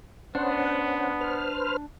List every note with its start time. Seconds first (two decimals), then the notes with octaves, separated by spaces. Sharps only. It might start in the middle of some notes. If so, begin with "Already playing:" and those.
0.35 B3 C#4 D4 C5 F#5
1.21 B4 C5 F6